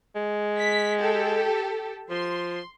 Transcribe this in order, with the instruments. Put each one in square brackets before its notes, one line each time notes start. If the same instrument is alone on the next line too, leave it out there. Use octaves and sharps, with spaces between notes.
[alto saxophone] G#3
[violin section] B6
G4 A4
[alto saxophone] F3 [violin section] C6